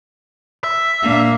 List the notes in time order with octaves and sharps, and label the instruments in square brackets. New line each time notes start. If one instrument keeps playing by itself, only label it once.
[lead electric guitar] E5
[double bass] A#2 D4 [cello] A#3